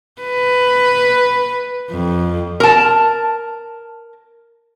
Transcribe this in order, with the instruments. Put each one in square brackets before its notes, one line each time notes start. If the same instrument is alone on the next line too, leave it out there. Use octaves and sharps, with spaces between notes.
[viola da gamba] B4
F2
[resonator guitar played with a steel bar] A#4 A5